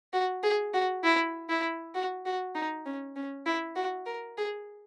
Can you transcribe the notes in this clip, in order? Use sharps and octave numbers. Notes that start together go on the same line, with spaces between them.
F#4
G#4
F#4
E4
E4
F#4
F#4
D#4
C#4
C#4
E4
F#4
A#4
G#4